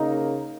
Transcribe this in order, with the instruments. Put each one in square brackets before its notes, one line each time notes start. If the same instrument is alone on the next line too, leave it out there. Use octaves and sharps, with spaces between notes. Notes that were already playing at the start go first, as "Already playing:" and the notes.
Already playing: [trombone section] C#3 A#3 D#4